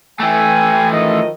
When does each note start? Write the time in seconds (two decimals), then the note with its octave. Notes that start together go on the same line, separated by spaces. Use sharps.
0.20 E3 A3 G5 G#5
0.91 D#3 F3 D#5